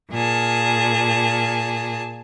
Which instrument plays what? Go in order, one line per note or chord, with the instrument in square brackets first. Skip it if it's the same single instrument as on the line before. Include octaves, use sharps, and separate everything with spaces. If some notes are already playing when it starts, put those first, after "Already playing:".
[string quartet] A#2 G#4 A5